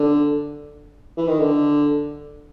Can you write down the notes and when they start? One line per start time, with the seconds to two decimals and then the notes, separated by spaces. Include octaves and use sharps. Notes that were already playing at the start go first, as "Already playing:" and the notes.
Already playing: D3
1.17 E3
1.28 D#3
1.39 D3